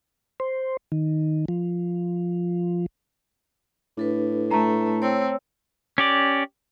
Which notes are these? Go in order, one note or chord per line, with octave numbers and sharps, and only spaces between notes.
C5
D#3
F3
A2 D4 A4 B4
A3 A5 A#5
C4 C#5 E6
C#4 G4 D5